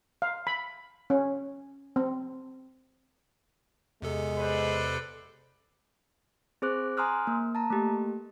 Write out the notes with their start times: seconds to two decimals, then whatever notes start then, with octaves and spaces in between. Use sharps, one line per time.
0.22 F5
0.47 B5
1.10 C#4
1.96 C4
4.02 E2 C3 G#3 A4
4.38 B4 C5 D5
6.62 C4 G#4 C5 D6 F#6
6.97 G#5 A#5 C6 D#6 F6 F#6
7.27 A#3
7.55 A5 A#5
7.70 A3 A#3 G4